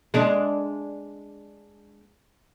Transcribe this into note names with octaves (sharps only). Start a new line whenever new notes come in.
G#3 D4